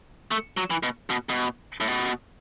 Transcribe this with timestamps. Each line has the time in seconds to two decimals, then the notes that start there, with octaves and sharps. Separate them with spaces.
0.31 A3
0.57 F#3
0.70 E3
0.83 B2
1.10 B2
1.29 B2
1.80 A2
1.88 B2